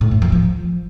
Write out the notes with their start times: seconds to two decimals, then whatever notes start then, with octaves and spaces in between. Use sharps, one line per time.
0.01 A2
0.11 F#2
0.22 F3
0.32 F3